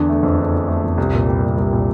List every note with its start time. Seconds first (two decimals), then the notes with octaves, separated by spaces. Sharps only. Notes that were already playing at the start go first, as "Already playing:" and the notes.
Already playing: E2 D3 D4
0.09 A3
0.23 F2
0.38 D4
0.53 D3
0.68 A3
0.84 F2
0.98 C2
1.13 A#2
1.28 G3
1.43 C2
1.57 C2
1.73 A#2